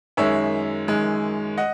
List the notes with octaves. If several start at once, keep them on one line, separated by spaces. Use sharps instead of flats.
F#2 D#3 G#3 C#5 E5
F#2 D#3 G#3
D#5 F#5